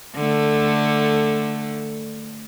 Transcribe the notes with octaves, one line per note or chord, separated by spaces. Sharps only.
D3 A3